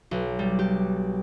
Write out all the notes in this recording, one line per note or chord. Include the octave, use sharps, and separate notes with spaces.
B1
G3
G4